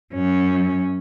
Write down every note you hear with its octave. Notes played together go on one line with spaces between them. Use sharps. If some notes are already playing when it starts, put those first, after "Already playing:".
F#2 C#4